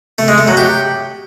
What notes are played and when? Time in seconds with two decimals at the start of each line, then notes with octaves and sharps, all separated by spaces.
0.18 A3
0.28 G#3
0.38 A3
0.47 F#3
0.57 G4